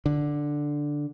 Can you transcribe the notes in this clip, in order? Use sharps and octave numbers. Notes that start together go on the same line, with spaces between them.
D3